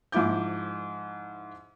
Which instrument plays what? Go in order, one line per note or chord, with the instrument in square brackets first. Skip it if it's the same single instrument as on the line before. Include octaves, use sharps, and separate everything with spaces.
[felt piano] G#2 F3 E4 D6 G6